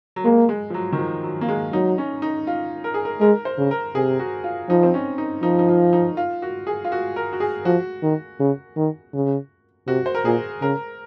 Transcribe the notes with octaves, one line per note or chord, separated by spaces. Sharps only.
F#3
G#3 A#3
G#3
F3
F#3
D#3
F3
F#3
A#3
G#3
F#3 D#4
C#4
D#4
F4
A#4
G#4
A#4
G#3 A#4
C5
C#3
A#4
C3 G#4
F#4
F4
F3 D#4
C4
C#4
D#4
F3 D#4
D#4
F4
D#4
F4
F#4
G#4
F4
F#4
A#4
F#4
G#4
F3 F#4
D#3
C#3
D#3
C#3
C3 F#4
C5
A#4
A#2 G#4
C#3 A#4